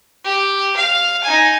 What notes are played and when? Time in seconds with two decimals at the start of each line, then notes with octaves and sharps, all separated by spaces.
0.24 G4
0.77 F5
1.23 D#4 G#5